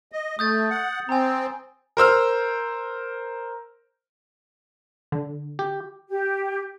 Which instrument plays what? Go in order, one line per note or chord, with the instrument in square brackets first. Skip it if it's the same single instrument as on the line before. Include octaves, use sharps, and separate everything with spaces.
[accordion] D#5
[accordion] A3 [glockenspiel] D#6 G6 A6
[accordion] F#5
[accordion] C4 [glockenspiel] G#5 A#5
[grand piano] A#4 C5 E6 F6
[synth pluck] D3
[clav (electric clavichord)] G4
[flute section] G4